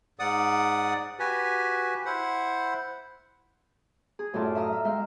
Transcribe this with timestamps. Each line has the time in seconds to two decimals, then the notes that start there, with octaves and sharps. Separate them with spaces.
0.19 G#2 D5 F#5 D#6
1.19 F#4 G4 B4 G#5
2.06 E4 C5 F#5
4.19 G#4
4.33 F#2 A2 F4 D5 A5
4.55 E5 F5 A#5 D#6 F6
4.72 E5
4.84 G#3 E5 F5 G5